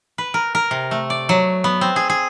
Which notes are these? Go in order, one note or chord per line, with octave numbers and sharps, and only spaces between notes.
B4
A#4
A#4
C3
A3
D5
F#3
B3
C4
G#4
G#4